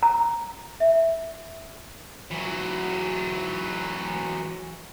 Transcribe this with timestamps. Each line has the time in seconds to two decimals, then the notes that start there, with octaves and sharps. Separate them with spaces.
0.03 A#5
0.80 E5
2.31 E3 F#3